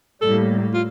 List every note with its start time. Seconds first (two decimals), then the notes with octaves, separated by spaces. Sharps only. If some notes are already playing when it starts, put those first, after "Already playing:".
0.22 A2 G3 A#3 A4
0.74 F4